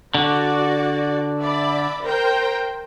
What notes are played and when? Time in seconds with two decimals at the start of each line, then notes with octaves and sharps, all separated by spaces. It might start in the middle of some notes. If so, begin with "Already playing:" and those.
0.15 D3 F#4 D5
1.40 D5 E5 B5
2.03 A#4 C5 G5